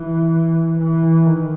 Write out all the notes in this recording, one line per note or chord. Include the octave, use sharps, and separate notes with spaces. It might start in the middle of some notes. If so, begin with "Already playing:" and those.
Already playing: E3
E3
D#3